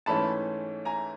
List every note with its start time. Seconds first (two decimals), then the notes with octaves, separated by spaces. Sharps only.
0.06 G#2 E3 A3 C#4 A5 B5
0.85 G#5 A#5